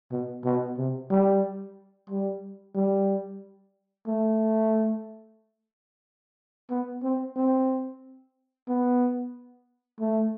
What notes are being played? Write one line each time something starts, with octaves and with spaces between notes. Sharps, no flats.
B2
B2
C3
G3
G3
G3
A3
B3
C4
C4
B3
A3